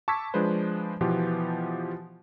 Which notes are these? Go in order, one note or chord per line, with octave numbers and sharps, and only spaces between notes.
A5 C#6 D6 E6 G#6 B6
F3 G#3 D4 B4 C5
B2 E3 F3 B3 F4 G4